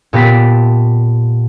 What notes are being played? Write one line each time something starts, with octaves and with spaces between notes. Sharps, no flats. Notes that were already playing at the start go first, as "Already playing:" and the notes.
A#2 B3 G4 A5 A#6 B6